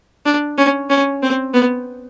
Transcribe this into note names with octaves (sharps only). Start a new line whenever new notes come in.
D4
C#4
C#4
C4
B3